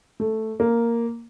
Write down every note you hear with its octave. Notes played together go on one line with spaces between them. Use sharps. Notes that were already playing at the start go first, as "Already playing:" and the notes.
A3
A#3